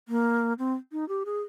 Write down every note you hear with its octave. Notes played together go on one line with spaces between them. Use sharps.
A#3
C4
D#4
G4
G#4